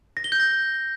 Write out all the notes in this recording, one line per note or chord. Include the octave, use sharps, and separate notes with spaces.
A#6
G7
G6
A#6